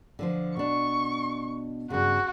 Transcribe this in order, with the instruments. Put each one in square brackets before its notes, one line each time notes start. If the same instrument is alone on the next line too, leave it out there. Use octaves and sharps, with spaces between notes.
[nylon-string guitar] D3 F3 C5
[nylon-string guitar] B2 D4 [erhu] C#6
[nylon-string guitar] G2 C#3 [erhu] F#4